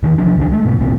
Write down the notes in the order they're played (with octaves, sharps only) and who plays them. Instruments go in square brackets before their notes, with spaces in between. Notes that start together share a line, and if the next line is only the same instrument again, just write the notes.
[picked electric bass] E2 D#3 E3
C3 F3 F#3 D4
C#2 D#3 C#4 D4
G#3 A3
G#2 B2 B3
D#1 C2 A#2 C4